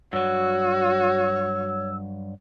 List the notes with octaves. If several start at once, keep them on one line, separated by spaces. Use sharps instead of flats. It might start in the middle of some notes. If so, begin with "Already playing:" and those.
G2 F#3 F#4 C#5 E6